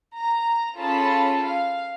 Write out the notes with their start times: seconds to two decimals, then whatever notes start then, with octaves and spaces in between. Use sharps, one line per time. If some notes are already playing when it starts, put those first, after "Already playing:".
0.16 A#5
0.78 C#4 F4 G#4 A4 A5 B5
1.45 F5